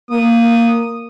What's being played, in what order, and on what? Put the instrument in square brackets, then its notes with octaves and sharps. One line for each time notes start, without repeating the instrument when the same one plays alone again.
[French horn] A#3 [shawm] D#6